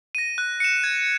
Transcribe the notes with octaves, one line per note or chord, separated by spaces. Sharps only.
A#6 D#7
F#6
C#7 E7
G#6